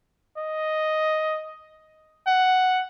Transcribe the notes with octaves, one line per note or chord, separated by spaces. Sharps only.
D#5
F#5